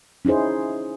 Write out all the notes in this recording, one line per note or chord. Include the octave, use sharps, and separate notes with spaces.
C#4 D#4 E4 G#4 C5